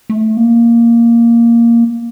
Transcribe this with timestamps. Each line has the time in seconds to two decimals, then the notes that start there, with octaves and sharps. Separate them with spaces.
0.10 A3
0.37 A#3